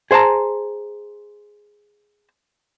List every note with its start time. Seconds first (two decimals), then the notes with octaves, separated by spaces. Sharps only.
0.11 G#4 C5 E5 A5 A#5